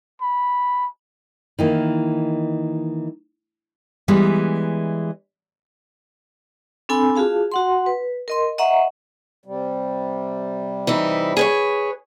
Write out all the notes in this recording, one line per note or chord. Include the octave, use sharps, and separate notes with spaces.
B5
D#3 E3 A#3
E3 G3 G#3 B3
C4 D4 A4 G#5 B5 E6
F4 F#4 G#4 F5 A5
F#4 F#5 C6
B4
A#4 D#5 C6
D#5 E5 F#5 A#5 C#6
C3 G3
E3 D#4 E4
G#4 B4 C#5